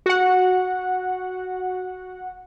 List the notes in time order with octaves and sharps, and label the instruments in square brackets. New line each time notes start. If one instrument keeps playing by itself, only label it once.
[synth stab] F#4 F#5